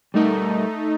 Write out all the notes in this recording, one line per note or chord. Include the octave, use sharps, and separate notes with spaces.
G3 A3 D#4 A#4